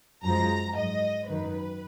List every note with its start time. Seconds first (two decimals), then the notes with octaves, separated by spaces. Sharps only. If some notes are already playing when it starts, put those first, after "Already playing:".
0.23 F#2 F3 G#3 A#5
0.76 G#2 F#3 D#5
1.28 F#2 D#3 F#3 B4